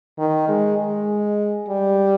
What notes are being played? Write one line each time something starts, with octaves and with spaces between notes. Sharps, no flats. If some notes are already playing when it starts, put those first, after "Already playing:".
D#3
G#3
G#3
G3